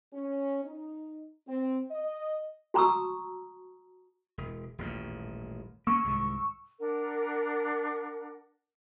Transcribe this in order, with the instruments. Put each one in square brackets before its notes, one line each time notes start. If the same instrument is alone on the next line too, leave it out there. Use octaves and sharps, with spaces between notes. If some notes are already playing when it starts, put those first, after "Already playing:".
[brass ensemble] C#4
D#4
C4
D#5
[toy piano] F#4 A5 A#5 C#6 D#6 E6
[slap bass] E1
D#1 A1 G#2
[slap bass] A#3 C#4 [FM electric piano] C#6 E6
[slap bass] C2 G#2 D#3
[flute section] D4 A#4 F#5